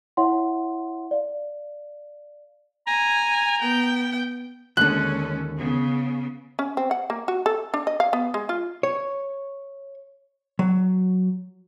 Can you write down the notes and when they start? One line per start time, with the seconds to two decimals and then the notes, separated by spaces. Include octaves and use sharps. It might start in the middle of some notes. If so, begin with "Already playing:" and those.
0.17 E4 C#5 E5 F#5 C6
1.11 D5 F5
2.87 G#5 A#5
3.61 B3 G5
4.77 D#2 D3 G#3 C#4 A4 F#6
5.58 C#3 B3
6.59 C#4
6.77 C4
6.91 F#5
7.10 A#3
7.28 F#4
7.46 A4
7.74 D4
7.87 D#5
8.00 F5
8.13 B3
8.34 G#3
8.49 F4
8.83 C#5
10.59 F#3